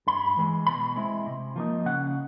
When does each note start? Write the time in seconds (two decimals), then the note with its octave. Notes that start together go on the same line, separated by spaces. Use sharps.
0.07 G2 B5
0.37 E3 G#3
0.67 B2 B5
0.96 G#3 C4 E4
1.26 C3
1.56 F3 A#3 D#4
1.85 C#3 F#5